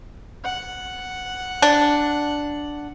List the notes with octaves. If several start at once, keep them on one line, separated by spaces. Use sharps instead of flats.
F#5
D4